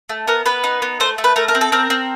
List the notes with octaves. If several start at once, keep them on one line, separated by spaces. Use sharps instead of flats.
A3
B3 A#4
B3 B4
D#4
B3
A3 C5
A3
B4
A3 A#4
A#4
C4
A4
C4 A#4
C4